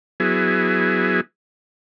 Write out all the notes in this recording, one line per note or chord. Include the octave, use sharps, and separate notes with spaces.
F#3 B3 E4 G#4